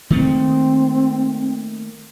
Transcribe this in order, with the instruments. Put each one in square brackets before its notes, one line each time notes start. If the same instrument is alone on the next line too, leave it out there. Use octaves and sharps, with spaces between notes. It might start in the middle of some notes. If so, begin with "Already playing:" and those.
[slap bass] D#3 A3 A#3 [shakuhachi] C4